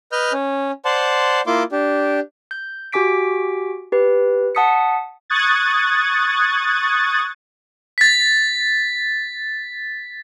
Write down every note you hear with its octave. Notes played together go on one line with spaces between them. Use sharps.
B4 D#5 F6 G6
C#4
C5 D5 F#5 A5 C6
A#3 E4 F4 C6 D6
D4 G4
G6
F#4 G4 G#5 D6 B6 D7
G4 B4
F#5 A5 D#6 B6 C#7
C#6 D#6 F#6 G#6 A6
A6 B6